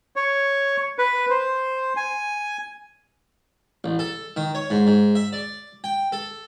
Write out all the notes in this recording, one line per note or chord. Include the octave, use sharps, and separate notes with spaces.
C#5
B4
C5
G#5
A1
A4
D#3
C#5
G#2
G#2
E5
D5
G5
A4